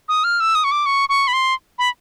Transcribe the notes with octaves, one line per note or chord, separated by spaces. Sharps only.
D#6
F6
E6
D#6
C#6
D6
C#6
C#6
B5
C6
B5